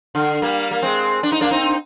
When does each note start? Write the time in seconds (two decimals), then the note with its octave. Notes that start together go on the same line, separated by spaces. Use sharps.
0.15 D3
0.42 G3 A#3
0.71 A#3
0.82 G#3 C4
1.23 D4
1.32 D#4
1.41 A#3 D4
1.51 C4 D#4